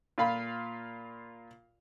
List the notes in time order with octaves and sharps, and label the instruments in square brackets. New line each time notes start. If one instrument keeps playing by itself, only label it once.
[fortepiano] A#2 F4 F5 B5